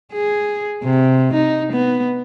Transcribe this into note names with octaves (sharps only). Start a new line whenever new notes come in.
G#4
C3
D#4
B3